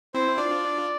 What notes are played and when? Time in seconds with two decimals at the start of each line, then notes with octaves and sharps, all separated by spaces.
0.14 C4 E4 C5
0.37 D4 F4 D5